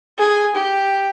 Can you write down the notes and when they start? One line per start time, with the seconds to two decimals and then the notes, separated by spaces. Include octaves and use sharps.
0.18 G#4
0.56 G4